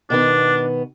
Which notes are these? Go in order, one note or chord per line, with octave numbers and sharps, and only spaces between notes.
B2 D#3 B3 D4